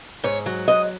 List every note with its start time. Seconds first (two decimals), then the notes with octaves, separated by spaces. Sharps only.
0.24 G#2 C#5
0.46 F#3
0.68 G#2 D#5